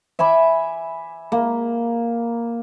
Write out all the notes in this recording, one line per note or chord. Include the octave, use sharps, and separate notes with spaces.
E5 G#5 B5 D6
A#3